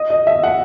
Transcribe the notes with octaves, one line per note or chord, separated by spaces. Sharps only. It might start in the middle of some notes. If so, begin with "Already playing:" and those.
Already playing: D#5
D#5
E5
F#5